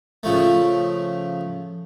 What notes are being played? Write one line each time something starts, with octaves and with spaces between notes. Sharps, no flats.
C#3 F3 A3